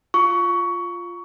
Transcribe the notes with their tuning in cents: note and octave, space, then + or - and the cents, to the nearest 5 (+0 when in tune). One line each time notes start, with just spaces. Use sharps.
F4 +0 C#6 +20